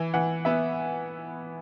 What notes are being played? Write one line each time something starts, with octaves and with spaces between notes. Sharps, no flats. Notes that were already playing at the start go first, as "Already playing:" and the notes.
Already playing: E3
E3 F#5
B3 E5